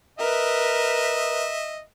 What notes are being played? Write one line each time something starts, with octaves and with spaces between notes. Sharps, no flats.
A#4 B4 D#5 E5